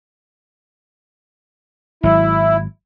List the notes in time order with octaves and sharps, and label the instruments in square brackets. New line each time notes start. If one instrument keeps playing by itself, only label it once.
[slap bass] G#1 F#3 [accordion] E4